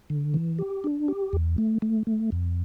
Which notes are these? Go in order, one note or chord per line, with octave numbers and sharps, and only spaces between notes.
D3
E3
G4
D4
G4
E2
A3
A3
A3
F2